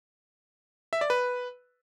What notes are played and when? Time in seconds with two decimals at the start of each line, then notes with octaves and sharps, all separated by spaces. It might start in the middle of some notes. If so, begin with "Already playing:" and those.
0.93 E5
1.01 D5
1.10 B4